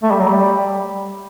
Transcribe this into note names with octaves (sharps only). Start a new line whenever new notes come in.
A3
G3
F#3
G3